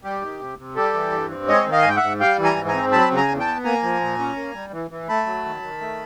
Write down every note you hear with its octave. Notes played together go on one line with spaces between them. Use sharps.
G3 G4
D#3
C3
C3
G3 G4 A4
E3
G2
C4
G#3 C#5 D#5
D#3
D#5 F5
G#2 G#5
G5
E5 F#5
G#2
G3 F5 G5
E3
G#5 A#5
G#2
G#5 A#5
C4
F#3 A5 B5
C#3
G#5 A#5
E2
G5 A5
B3
A#3 G#5 A#5
F3
A#2
C#4
A#3
G3
E3
E3
A3 A5 B5
F#3
D#3
D#3
A3